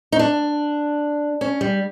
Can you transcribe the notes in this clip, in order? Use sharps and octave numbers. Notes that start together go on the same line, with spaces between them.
D#4
D4
C#4
G3